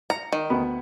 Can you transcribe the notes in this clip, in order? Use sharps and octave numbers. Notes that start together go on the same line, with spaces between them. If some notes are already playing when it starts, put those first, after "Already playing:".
A#5 C#7
D#3
D2 B3 B5